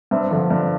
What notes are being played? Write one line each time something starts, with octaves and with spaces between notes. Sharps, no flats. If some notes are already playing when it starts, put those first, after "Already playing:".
G2 C5 E5
D3 F3
G2